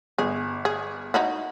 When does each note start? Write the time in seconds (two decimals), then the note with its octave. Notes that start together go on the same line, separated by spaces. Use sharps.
0.18 G1 G#4
0.65 G#4
1.14 D#4 E4 F#4